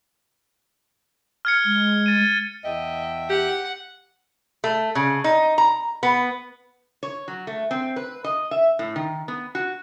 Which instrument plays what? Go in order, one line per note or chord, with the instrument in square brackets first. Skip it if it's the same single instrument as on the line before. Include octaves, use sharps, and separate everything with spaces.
[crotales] F6 G#6 C#7
[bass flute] G#3
[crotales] A6 D#7
[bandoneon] E2 E5 G5 [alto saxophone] D#5
[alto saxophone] G4 [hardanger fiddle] F#5
[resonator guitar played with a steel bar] A3
C#3
D#4
A#5
B3
C#5
F#3
A3
C4
B4
D#5
E5
A2
D#3
B3
F#4